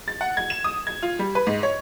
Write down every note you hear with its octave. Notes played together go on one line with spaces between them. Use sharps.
A6
F#5
G#6
E7
D#6
G#6
F4
G3
B4
G#2
C#5